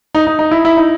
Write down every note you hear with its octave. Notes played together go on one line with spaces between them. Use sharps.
D#4
D#4
D#4
E4
E4
D#4